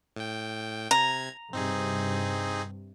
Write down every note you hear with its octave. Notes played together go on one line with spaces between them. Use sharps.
A2 G5
C3 A#5 G#6
G2 C3 C4 D#4 G#4